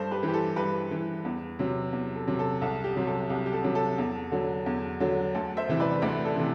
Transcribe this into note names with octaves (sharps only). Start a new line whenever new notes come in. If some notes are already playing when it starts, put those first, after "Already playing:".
Already playing: G2 A4 C5
G4 B4
E3 G4
A4
G2 G4 B4
E3
E2
C3 F#3
E2
A4
C3 F#3
A4
C2 A4
G4
C3 F#3
A4
C2 G4
G4
A4
C3 F#3
A4
E2
D3 F#3
E2
D3 F#3
D2 A4
C5 E5
C3 E3
B4 D5
D2 B4 D5
A4
C3 E3